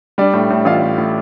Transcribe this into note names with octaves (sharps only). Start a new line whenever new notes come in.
G3 D4 D5
A2
A2
A1 F4 F5
A2
A2